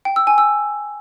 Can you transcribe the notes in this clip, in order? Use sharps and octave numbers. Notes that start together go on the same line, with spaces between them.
G5
E6
G#5
E6